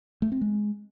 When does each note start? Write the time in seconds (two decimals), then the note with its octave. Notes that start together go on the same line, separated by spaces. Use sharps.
0.22 A3
0.32 C4
0.41 G#3